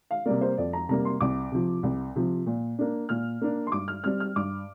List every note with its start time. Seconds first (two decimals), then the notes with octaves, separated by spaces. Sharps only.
0.11 F5
0.26 C3 G3 A#3 D5
0.41 C5
0.57 F2 D5
0.73 A#5
0.89 C3 G3 A#3 A#5
1.05 C6
1.21 C2 D6
1.52 C3 F3
1.83 C2
2.16 C3 F3
2.46 A#2
2.79 A#3 D4
3.09 A#2 F6
3.42 A#3 D4
3.67 C6
3.72 G2 D6
3.88 F6
4.03 G3 C4 F6
4.20 F6
4.36 G2 D6